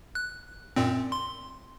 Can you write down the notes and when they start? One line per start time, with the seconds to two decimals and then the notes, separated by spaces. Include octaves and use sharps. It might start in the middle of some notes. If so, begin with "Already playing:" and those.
0.15 F#6
0.76 F#2 A#2 C4
1.12 C6